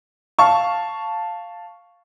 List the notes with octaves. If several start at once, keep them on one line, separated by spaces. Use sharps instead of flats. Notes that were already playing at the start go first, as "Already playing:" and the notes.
F5 A5 C#6